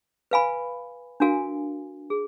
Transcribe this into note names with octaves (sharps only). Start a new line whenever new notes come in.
B4 F5 G#5 B5
D4 F#4 A#4 F5 G#5
G#4